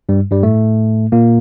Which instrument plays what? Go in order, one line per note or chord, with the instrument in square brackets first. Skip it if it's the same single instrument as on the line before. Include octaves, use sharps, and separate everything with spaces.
[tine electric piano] G2 G3
G2 G3
A2 A3
A#2 A#3